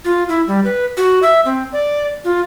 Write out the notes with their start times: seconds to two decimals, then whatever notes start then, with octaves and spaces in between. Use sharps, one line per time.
0.05 F4
0.29 E4
0.47 G3
0.65 B4
0.97 F#4
1.23 E5
1.45 C4
1.73 D5
2.25 F4